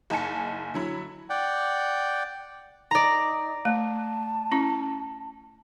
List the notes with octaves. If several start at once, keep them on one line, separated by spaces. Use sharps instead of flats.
F#1 D#4 G#5 A5 C#7
D3 F#3 E4
D5 F#5 G5
D#4 D5 A#5
A3 A5
C#4 E4